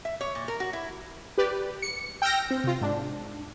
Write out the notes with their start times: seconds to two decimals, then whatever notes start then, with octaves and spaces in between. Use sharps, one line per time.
0.05 E5
0.21 C#5
0.35 A#2
0.48 A#4
0.60 F#4
0.73 E4
1.38 G4 B4 D5
1.82 C#7
2.22 G5 E6 F6 G6 A#6
2.51 C4
2.64 C3 F4
2.81 G#2 D4